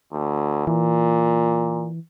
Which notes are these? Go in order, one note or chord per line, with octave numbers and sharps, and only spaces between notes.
D2
A#2 E3